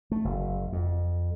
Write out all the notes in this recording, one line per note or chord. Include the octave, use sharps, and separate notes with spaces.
A3
F#1
F2